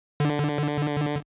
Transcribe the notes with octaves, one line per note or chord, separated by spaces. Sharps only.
D3